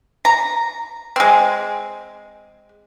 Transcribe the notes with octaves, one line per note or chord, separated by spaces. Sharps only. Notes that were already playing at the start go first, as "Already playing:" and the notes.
A#5
G#3 C4